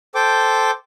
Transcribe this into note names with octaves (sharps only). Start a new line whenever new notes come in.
A4 C5 G5 D6